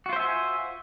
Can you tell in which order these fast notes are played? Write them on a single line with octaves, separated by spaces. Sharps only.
F#4 F4 C5 E5 G#5